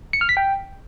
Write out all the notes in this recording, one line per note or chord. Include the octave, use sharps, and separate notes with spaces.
C#7
F6
B6
G5